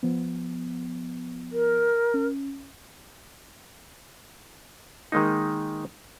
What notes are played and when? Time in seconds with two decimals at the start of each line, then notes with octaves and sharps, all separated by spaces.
0.03 F3 B3
1.52 A#4
2.14 C#4
5.12 D#3 G#3 A#3 D#4